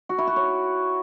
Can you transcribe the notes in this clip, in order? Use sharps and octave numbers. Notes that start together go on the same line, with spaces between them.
F#4
E4
F#4
C#5